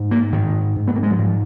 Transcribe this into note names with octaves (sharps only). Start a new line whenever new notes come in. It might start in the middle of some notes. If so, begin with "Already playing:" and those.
Already playing: G#2
A#3
G#2 D#3
G#2
B3
A#3
G#3
F#3
G#2 F3